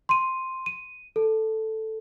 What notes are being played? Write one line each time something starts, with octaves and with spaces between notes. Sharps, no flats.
C6 D#7
D#7
A4